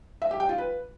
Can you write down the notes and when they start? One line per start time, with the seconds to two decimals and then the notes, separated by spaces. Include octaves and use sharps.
0.22 E5
0.31 G4
0.40 G5
0.49 F4
0.58 B4